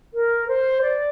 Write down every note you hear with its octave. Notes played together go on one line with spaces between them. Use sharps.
A#4
C5
D5